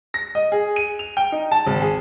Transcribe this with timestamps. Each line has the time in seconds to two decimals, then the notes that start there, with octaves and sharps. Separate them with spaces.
0.14 A#6
0.35 D#5
0.52 G#4
0.76 D#7
0.99 F7
1.17 G5
1.32 D#4
1.52 A5
1.67 G#1
1.82 G#4